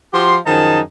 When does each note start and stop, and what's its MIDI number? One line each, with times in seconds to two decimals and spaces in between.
0.14 0.37 53
0.14 0.37 66
0.14 0.37 67
0.14 0.37 84
0.46 0.80 42
0.46 0.80 51
0.46 0.80 53
0.46 0.80 63
0.46 0.80 68
0.46 0.80 81